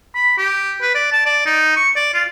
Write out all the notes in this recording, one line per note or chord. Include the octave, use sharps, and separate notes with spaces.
B5
G4
B4
D5
A5
D5
D#4
C#6
D5
F4